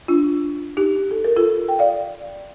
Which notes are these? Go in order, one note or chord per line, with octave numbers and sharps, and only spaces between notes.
D4 F4
D#4 G4
A4
A#4
F4 A4
G5
D5 F5